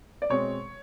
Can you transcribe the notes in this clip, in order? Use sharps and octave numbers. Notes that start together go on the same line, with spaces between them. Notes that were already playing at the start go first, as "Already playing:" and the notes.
D5
B2 G#3 C4 C#5